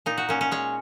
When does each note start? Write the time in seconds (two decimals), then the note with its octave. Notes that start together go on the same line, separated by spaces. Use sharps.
0.06 A#2 D#4
0.18 F#4
0.29 A#2 C#4
0.41 C#4
0.52 G#3 C#5